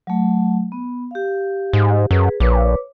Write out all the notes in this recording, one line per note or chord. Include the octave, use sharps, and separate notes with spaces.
F#3 A3
B3
G4 F5
G#2
F#2 G#4 B4
A#1 B4 C#5 D6